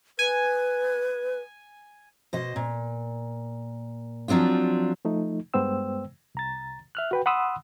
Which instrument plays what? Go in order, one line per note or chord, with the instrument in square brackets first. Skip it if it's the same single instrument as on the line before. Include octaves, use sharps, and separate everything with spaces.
[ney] B4 [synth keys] G#5
[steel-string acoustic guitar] B2 C5 D#5
A#2
F3 F#3 C4 D4 F4
[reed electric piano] F3 A3 D#4
G2 G#3 B3 C5 G5 E6
C2 A#5 A6
E5 F6 F#6
F#4 B4 G5
F#5 B5 C6 D#6 E6 F#6